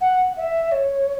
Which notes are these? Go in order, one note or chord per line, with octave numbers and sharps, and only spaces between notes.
F#5
E5
C#5